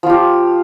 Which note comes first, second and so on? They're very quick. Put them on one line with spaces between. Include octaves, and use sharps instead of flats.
F3 F4 G4